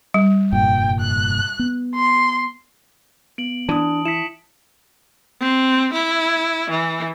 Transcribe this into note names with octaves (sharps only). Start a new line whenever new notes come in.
G3
F1 G2 A#2 G5
F#6
B3
C6
B3 D7 F#7
E3 D4 A5 D#6
E4 B6 C#7 E7
C4
E4
E3